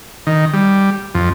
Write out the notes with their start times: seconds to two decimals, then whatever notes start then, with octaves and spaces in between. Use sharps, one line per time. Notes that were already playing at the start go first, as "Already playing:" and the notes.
0.27 D#3
0.53 G3
1.14 F2